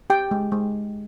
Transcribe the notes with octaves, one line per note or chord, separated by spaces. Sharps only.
G4 G5
G#3
G#3